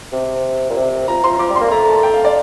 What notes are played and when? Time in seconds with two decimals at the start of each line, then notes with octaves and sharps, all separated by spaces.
0.13 C3
0.70 A#2
0.77 C3
1.08 F3 A#5
1.24 F3 C6
1.39 F3 D6
1.50 G3
1.56 C6
1.61 A#3
1.71 A3 A#5
1.88 A5
2.03 G5
2.14 F5
2.25 D5